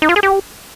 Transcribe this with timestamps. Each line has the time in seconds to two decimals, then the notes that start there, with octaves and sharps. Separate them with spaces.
0.02 D#4
0.09 F4
0.16 G#4
0.23 G4